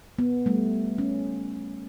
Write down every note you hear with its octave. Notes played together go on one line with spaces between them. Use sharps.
B3
G3 A3
C#4